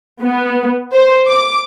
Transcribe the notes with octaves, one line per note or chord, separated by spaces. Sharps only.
B3
C5
D6